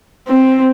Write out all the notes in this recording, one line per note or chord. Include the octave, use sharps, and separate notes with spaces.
C4